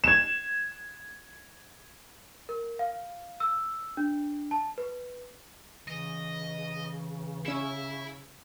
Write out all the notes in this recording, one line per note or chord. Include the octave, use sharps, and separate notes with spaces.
G#6 E7
A#4
F5
E6
D4
A5
B4
C#3 E3 D#5
C#4 E4 E6 E7